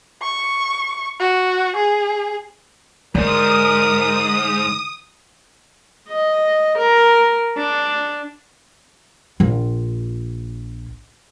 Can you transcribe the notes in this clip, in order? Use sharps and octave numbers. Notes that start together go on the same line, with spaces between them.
C#6
F#4
G#4
E2 G#2 D3 A#4 D#6
D#5
A#4
D4
A#1 F4